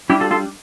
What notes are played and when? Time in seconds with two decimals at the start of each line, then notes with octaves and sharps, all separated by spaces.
0.10 G3 D4 E4 G4
0.20 F4 A4
0.31 F4 A4